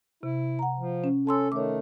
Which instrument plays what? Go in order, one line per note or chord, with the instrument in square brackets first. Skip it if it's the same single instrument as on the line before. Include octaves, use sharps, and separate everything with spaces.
[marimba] C3 [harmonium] E4
[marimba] F#5 A#5
[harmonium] F3
[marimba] C#4
[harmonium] C#4 A4 [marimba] A5 C6 E6
[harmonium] D#3 A3 [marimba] C#5 D6